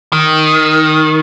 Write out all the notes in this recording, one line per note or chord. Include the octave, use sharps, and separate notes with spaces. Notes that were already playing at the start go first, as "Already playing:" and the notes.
D#3